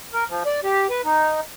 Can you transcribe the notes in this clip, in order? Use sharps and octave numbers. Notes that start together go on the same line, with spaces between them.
A#4
F3
D5
G4
B4
D#4